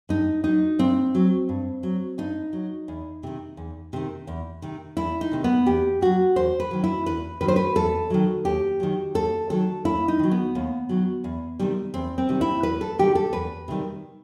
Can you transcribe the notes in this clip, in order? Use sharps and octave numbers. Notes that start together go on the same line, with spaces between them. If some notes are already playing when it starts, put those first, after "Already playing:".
G2 D#4
F#3 D#4
G2 C4
F#3
G2
F#3
G2 D#4
F#3
E2
C3 D#3
E2
C3 D#3
E2
C3 D#3
E2 E4
D#4
C3 D#3
B3
E2 G4
D#3 F#3 F#4
E2 C5
B4
D#3 F#3
E4
E2 B4
D#3 F#3 B4
C5
B4
E2 A4
D#3 F#3
D#2 G4
D#3 F#3
D#2 A4
D#3 F#3 A4
D#2 E4
D#4
D#3 F#3
B3
D#2
D#3 F#3
E2
C3 D#3 G3
E2 C4
C4
C3 D#3 G3
E4
E2 B4
A4
C3 D#3 G3 G4
A4
E2 B4
C3 D#3 G3